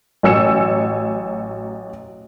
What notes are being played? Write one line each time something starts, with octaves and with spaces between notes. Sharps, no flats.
A1 F#3 G#5 E6 C#7 E7